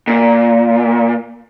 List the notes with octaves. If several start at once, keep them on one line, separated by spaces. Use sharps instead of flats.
A#2